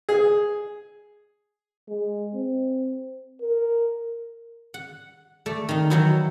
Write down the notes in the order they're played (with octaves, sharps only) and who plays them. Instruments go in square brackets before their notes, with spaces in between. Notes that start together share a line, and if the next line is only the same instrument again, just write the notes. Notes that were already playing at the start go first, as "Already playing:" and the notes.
[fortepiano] G#4
[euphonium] G#3
C4
A#4
[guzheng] F#5
A3 D5
D#3 D#4
D#3 E3 F#3 D#4 E4